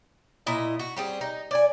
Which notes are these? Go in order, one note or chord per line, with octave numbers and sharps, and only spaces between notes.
A#2 E4 D#5
F#4
G3 C4 G#4
D#4
D5 G#5